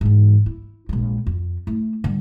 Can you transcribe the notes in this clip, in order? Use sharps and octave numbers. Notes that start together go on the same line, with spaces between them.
G#2 E3
E4
A#1 G#3
F2
A3 E4
D3 G3